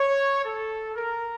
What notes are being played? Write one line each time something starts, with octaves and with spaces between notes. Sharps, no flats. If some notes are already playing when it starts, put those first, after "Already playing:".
Already playing: C#5
A4
A#4